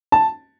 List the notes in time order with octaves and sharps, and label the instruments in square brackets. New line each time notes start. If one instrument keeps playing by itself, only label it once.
[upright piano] A5